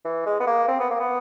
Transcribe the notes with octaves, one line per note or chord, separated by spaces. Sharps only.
E3
G#3
B3
A#3
C4
B3
A#3
B3